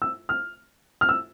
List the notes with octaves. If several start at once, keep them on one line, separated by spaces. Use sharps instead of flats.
E6
F6
F6
E6